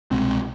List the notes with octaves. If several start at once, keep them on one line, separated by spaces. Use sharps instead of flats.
C2 B2 G#3 C4